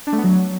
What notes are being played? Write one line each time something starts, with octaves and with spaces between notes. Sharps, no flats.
D4
A3
B3
F#3